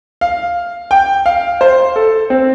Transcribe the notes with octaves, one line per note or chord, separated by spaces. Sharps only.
F5
G5
F5
C5
A4
C4